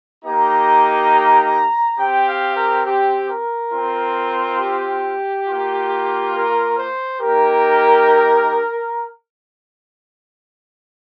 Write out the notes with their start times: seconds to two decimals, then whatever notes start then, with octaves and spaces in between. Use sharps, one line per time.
0.24 A#3 D#4 G4 A#5
1.98 C4 G4 G5
2.27 F5
2.55 A#4
2.86 G4
3.28 A#4
3.72 C4 F4
4.59 G4
5.47 A#3 F4
6.34 A#4
6.78 C5
7.21 A#3 D#4 G4 A#4